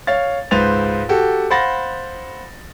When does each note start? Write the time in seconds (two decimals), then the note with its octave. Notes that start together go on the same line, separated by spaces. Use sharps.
0.07 C#5 F5 A6
0.51 C#2 G#2 B4 C5 A6 F7
1.09 F#4 G4 A4
1.50 C5 F5 F#5 B5 A6 A#6